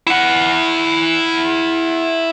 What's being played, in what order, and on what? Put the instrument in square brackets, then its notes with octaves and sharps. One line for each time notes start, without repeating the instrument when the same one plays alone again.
[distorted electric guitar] E4 F#5